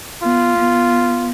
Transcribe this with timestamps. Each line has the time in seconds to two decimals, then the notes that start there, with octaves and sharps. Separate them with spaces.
0.23 B3 F4
0.58 B3